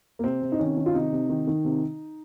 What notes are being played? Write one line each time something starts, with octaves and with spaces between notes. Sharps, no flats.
A#3
C3 C4
C3
D#4
D#3 C#4
D#3
F4
C3 D#4
C3
D#3
D#3
C3